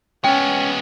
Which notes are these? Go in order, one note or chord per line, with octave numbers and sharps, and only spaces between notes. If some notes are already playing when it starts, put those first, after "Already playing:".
G#3 B3 C#4 G5